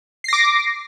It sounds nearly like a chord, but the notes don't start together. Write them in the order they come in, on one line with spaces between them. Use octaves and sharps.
C7 A#6 D6